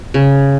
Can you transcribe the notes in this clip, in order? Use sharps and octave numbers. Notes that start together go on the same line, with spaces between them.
C#3